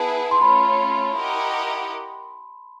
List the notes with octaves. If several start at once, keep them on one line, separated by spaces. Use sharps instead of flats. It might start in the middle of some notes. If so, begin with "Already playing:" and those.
Already playing: B3 E4 G#4 B4 A5
C6
A3 C#4 F4 B5
E4 G4 A#4 D#5 F#5